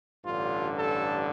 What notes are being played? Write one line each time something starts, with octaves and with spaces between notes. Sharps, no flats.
A1 G2 D3 F4
A4